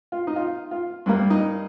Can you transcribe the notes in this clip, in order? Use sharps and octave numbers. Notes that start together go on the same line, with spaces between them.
F4
D#4
F4
F4
G2 G3 A#3
D#4